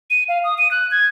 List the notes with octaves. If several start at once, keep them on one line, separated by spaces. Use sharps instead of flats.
D#7
F5
D#6
D#7
F#6
G#6